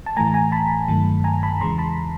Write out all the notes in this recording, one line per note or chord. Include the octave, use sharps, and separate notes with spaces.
A5
A2 E3 A3 G#5 A#5
G#5 A#5
A5 B5
G2 D#3 F#3 A3
G#5 A#5
A5 B5
E2 C#3 E3 G#3 A#5 C6
A5 B5